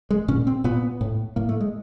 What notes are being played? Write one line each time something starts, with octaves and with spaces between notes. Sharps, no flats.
G#3
A#2 C#4
C4
A#2 B3
A2
A2 A#3
A3
G#3